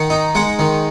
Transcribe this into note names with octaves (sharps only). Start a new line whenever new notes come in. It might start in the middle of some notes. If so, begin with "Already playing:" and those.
Already playing: D#3 F#5
D#4
G#3 F#5
D#3